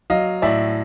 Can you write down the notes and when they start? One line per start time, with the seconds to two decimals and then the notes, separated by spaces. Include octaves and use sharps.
0.10 F#3 D#5 F5
0.42 A2 D5 E5